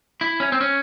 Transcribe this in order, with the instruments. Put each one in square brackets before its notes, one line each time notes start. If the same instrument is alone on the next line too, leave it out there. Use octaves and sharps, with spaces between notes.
[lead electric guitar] E4
C#4
C4
C#4